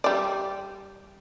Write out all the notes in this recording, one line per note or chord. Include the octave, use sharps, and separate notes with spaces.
G3 D5